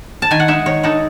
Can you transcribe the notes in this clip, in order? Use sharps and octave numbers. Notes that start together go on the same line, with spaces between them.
A5
D#3 G#5
F#5
G#3 D#4 E5
D#3 C#5
G#3 D#4 A4